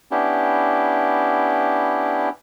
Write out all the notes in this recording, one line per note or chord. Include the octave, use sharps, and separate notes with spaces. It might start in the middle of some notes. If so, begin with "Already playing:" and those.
B3 C#4 D4 E4 G4